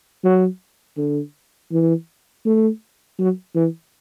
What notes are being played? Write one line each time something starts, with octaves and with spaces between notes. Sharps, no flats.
F#3
D3
E3
A3
F#3
E3